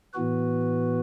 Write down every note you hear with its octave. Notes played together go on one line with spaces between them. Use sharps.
A2 E3 B3 F#4 B4